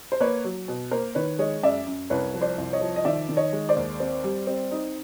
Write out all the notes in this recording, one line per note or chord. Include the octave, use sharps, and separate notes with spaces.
C5
A#3 B4 C#5
F#3
B2
A#3 A#4 C5
D#3 B4 C#5
G#3 C#5 D#5
F#2 D5 E5
F#2
C2 B4 C#5
F3
C5 D5
C2
C#5 D#5
F3
D#5
D#3 D5 E5
D#3
C#5 D#5
G#3
C5 D5
D#2
C4
G3
C4
D#4